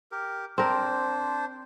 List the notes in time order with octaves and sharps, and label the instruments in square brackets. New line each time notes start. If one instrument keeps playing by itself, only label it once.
[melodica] G4 A#4
[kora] C4 A#4 [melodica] D4 C5